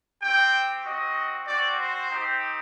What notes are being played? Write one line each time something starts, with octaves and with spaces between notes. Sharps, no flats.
C4 G4 G5
C4 F#4 D#5
C4 F#4 D5
C5
C4 D#4 G4